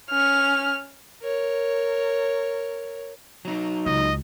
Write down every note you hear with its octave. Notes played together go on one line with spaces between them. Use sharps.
C#4 F6
A#4 C#5
F#3 D#4
C#2 D#5